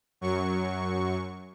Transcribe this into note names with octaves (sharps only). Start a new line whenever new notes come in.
F#2 F#3 C#6